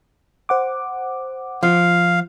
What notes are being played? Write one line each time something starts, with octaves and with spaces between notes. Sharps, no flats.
C5 F#5 D6
F3 F5